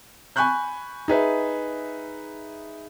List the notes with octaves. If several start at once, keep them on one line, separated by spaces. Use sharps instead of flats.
G#5 B5 C#6 F#6 G6
D#4 G#4 B4 E5